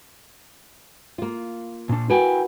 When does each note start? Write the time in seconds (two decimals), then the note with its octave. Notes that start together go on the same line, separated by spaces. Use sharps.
1.18 A#3 F4
1.89 A#2 D4
2.10 E4 F#4 A#4 B4 G5 G#5